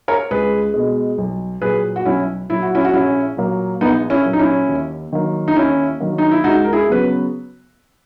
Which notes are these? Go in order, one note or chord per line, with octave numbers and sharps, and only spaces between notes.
A#4 C#5
C#2 G#4 B4
B2 G#3
B1
A#2 F#3 G#4 B4
F#4
B1 C#4 E4
A#2 F#3 E4
F#4
C#4 E4
F#4
A#1 C#4 E4
A#2 F#3 A#3
A#1 B3 D#4
C#4 E4
A#2 F#3 A#3
D#4
C#4 E4
D#2
D#3 F#3 A#3
D#4
D#2 C#4 E4
D#3 F#3 A#3
D#4
E4
C#2 D#4 F#4
A#4
E4 G#4
C#3 F#3 B3 F#4 B4